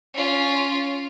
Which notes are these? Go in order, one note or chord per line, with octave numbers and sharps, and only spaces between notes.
C#4 F4